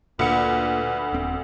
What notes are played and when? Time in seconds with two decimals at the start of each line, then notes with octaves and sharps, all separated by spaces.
0.19 D2 A#2 B4 C#7
1.13 D#1 C4